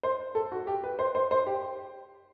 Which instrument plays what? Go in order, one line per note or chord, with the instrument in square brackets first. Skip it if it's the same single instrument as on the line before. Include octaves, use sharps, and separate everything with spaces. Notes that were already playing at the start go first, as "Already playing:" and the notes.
[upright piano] C5
A4
F#4
G4
B4
C5
C5
C5
G4